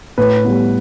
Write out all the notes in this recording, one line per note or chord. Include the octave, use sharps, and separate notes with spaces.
A2 B4
G3 B3